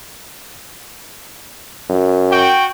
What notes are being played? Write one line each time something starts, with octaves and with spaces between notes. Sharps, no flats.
F#2
F#4 G5